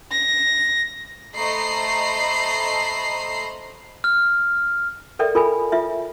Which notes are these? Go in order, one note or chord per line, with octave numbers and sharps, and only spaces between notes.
A#6
A3 C5 D#5 A#5 B5 C7
F6
A4 A#4 D5 E5 G5
F4 A4 A#4 G#5 B5
F4 E5